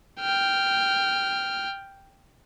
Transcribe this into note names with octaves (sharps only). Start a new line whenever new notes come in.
G5 F6